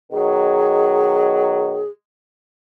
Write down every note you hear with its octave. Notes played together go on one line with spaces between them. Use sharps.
B2 D#3 F#3 G#4